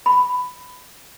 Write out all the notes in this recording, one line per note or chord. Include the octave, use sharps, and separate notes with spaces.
B5